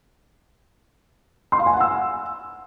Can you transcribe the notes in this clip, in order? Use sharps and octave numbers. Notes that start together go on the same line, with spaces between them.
C6
F5
G#5
F#5
E6